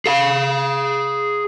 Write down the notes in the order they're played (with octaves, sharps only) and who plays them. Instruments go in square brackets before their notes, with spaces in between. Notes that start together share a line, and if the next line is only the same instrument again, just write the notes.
[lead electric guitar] G#4 F5